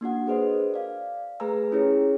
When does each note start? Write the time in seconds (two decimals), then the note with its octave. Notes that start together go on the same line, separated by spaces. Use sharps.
0.01 A#3 D4 F#4 F#5
0.26 D4 G#4 B4 C5 D#5
0.49 A#4
0.74 D5 F5
1.40 A3 G#4 B4 G#5 A#5 E6
1.72 C#4 E4 G4 G#4 C#5